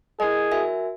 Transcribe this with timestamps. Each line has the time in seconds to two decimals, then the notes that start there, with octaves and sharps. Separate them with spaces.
0.20 E4 G#4 A#4 D#5
0.51 F#4 A#4 E5 G#5